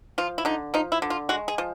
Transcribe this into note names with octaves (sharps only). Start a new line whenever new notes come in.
F3 F4
E4
D3 D#4
F3 D#4
E4
D3
F4
G#3 F#4
G#4
F3